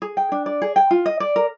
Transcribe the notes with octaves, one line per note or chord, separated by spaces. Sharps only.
G#4
G5
D4
D5
G#4
G5
F4
D#5
D5
A#4